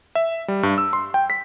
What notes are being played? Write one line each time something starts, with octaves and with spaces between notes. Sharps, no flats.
E5
G3
G2
E6
C6
G5
B6